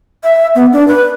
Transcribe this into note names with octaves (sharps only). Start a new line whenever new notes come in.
E5
B3
D4
B4